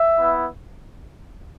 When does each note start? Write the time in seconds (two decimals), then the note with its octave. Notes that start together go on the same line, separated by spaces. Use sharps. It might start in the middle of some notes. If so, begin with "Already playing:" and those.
Already playing: E5
0.19 B3 E4